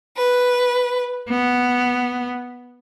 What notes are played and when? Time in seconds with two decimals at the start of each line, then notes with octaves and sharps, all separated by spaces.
0.16 B4
1.30 B3